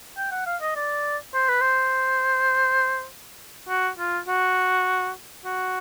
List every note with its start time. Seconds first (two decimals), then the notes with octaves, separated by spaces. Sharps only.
0.17 G5
0.32 F#5
0.46 F5
0.61 D#5
0.76 D5
1.34 C5
1.49 B4
1.61 C5
3.69 F#4
3.98 F4
4.28 F#4
5.45 F#4